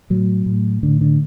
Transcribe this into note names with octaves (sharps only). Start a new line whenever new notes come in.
A2 F#3
A2
A2 D3
D3